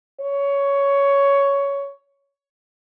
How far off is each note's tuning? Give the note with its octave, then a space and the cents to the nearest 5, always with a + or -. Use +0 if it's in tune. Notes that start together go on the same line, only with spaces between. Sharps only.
C#5 +10